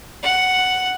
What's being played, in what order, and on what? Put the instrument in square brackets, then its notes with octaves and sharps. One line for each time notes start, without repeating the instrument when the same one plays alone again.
[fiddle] F#5